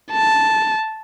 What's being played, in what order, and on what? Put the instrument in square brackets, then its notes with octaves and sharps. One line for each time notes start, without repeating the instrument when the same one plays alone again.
[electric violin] A5